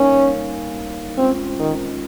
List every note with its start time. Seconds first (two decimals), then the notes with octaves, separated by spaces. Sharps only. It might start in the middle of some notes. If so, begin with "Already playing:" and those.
Already playing: G3 A#3 C#4 D#4 A#4 F5
1.17 G#3 C4 C#4 F4
1.59 D#3